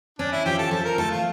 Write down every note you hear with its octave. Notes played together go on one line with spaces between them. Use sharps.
C#4 D4
E4
F3 G4
A4
F3 A4
A#4
A3 A4
F4